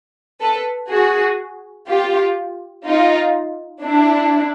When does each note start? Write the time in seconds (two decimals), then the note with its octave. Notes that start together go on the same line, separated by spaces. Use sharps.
0.41 A4 B4
0.90 F#4 G#4
1.88 F4 G4
2.86 D#4 F4
3.83 D4 E4